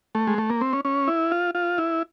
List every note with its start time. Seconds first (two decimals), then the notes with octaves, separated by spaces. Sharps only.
0.15 A3
0.27 G#3
0.38 A3
0.50 A#3
0.61 C4
0.73 C#4
0.85 C#4
1.08 E4
1.31 F4
1.55 F4
1.78 E4